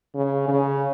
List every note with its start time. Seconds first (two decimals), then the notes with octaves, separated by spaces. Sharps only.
0.15 C#3
0.48 C#3